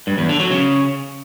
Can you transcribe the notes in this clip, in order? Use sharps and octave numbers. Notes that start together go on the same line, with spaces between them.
G2
E2
D3
F#3
C#3